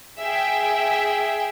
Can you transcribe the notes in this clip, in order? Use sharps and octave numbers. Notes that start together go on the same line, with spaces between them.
G#4 E5 G5